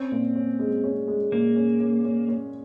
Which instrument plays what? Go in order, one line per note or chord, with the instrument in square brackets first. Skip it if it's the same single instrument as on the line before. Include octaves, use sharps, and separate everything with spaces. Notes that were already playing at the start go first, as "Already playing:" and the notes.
Already playing: [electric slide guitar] C4 [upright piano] C#4
[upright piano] A#2
C#4
G#3
C#4
G#3
[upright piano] A#2 [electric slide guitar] A#3
[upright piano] C#4
C#4
C#4
C#4